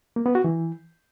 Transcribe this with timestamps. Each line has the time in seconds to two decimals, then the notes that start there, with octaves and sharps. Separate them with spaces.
0.16 A#3
0.26 B3
0.35 F#4
0.44 E3